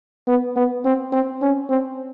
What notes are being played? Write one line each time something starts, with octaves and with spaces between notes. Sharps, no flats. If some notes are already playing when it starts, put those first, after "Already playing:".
B3
B3
C4
C4
C#4
C4